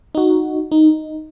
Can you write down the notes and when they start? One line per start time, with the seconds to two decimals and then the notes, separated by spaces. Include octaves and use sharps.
0.15 D#4 F#4
0.72 D#4